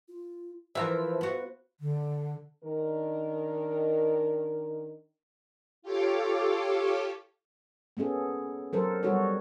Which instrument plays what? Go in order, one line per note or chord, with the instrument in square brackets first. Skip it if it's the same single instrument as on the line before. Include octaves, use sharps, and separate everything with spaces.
[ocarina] F4
[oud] E3 F4 A#4 [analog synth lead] F3 [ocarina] C5 [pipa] E5
[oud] B3 F#4
[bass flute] D3
[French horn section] D#3 D4 A#4
[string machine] F4 G4 A4 C#5 F5 D6
[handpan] A#3 B3 C#4 G#4 A4
F#3 A4 A#4 C5
G3 B3 F#4 A4 C#5